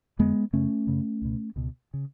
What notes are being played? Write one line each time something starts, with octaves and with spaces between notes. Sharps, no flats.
F2 D3 G#3 B3
F#2 C#3 A3 C#4
F#2 C#3
C#2 B2
C#2 B2
C#3